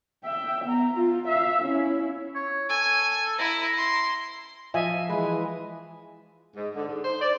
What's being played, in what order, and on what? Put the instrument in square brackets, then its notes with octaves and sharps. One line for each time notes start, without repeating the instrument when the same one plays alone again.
[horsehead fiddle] E5 G5
B3 A#5
F4
E5 F5
C#4 E4
[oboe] C#5
[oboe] A4 [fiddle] G#5
[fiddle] E4 [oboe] A#5
[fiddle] C6
[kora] F3 [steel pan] D#5 E5 G#5
[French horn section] E3 [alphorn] G#3 [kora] B4
[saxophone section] G#2
D3
G#2
C5
D5